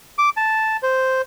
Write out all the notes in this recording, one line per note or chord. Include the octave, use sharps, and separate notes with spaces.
D6
A5
C5